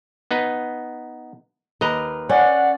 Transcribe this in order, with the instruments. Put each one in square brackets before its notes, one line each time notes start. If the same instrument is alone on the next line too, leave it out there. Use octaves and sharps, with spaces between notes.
[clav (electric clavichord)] B3 D#4 B4
[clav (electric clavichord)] D#2 D#5 A#5 [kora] A#4 B4
[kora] C#4 [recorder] D5 [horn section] F#5